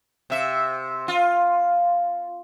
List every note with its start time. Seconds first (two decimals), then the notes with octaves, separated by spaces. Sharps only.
0.30 C3 E5
1.08 F4